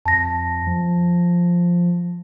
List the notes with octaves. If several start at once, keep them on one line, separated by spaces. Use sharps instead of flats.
F2 A5 A#6
F3